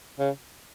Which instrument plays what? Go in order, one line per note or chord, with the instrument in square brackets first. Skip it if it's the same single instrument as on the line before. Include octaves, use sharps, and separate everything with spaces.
[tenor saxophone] C#3